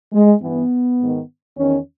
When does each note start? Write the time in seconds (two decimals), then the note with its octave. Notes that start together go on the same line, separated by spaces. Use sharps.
0.13 G#3
0.41 G2 E3 B3
0.99 G#2 D#3
1.57 E2 D#3 C#4